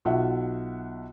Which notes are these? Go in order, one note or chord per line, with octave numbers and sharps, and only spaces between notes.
B1 F4 F#4 E5 F#5